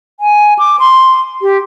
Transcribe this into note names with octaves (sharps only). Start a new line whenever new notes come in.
G#5
D6
C6
G4